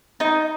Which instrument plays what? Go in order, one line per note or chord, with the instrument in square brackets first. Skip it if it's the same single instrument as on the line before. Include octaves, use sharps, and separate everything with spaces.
[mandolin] D#4